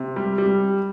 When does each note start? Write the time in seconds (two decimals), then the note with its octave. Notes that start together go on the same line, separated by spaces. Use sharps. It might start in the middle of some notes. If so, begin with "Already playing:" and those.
Already playing: C3
0.16 G3
0.38 G3